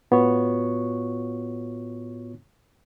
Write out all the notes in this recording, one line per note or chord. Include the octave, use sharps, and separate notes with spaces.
A2 B3 F4 F#4 C#5 C#6